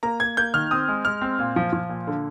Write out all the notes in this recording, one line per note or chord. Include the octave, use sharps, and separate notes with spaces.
A#3 A#5
A#3 G#6
A#3 G6
D#3 F6
C4 D#6
G#3
G#3 F6
C4
A#2
F3
F3
A#2
D3